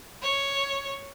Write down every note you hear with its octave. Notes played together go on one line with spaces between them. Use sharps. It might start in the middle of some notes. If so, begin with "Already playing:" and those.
C#5